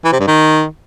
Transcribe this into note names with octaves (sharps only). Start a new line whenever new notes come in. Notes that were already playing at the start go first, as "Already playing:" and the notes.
E3
C3
G2
D#3